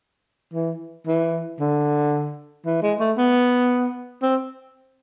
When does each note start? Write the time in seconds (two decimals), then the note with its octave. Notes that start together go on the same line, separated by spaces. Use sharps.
0.54 E3
1.07 E3
1.60 D3
2.65 E3
2.82 G#3
3.00 A3
3.17 B3
4.22 C4